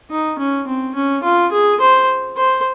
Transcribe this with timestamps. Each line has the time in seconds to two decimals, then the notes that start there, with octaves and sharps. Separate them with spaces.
0.10 D#4
0.38 C#4
0.67 C4
0.95 C#4
1.23 F4
1.52 G#4
1.80 C5
2.37 C5